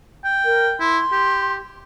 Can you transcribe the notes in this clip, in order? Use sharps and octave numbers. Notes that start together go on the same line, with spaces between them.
G5
A#4
E4 C6
G4